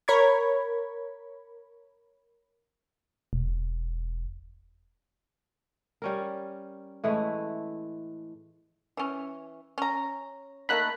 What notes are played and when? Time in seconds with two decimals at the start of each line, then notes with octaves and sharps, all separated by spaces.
0.08 A#4 C#5 B5 C#6 G#6
3.33 E1
6.02 G3 C#4 A#4
7.04 A2 E3 G#3 A3
8.97 E3 C#4
9.78 C#4 A#5
10.69 A3 A#3 D#4 B5 F#6